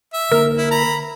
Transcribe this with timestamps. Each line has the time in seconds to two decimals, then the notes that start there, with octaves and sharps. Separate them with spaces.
0.13 E5
0.31 D3 A#3 A#4
0.57 E4
0.71 A#5 B5